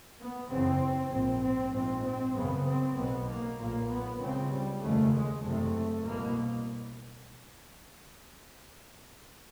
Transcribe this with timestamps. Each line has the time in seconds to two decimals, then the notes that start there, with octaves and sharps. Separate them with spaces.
0.18 B3
0.49 F#1 E2 C#3 C4
1.11 A#1 G#2 C4
1.42 C4
1.72 A#1 G#2 C4
2.04 C4
2.34 G#1 F#2 C#3 B3
2.65 C4
2.96 B1 B2 B3
3.26 A#3
3.58 B1 A#2 A#3
3.89 B3
4.19 C#2 C#3 C4
4.50 G3
4.81 F1 D#2 C#3 A3
5.12 G#3
5.43 F#1 E2 C3 A3
6.04 C2 B2 A#3